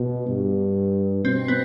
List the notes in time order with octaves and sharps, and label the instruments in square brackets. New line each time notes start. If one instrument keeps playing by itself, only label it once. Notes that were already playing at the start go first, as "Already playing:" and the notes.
Already playing: [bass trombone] B2
G2
[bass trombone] B2 [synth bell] C4
[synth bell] B3